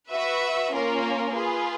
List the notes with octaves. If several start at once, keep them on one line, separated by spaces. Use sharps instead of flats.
F#4 B4 E5
A#3 C#4 F4 A#4
F4 G#4 B4